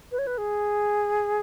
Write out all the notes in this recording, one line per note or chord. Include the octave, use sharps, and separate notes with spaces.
B4
C#5
B4
G#4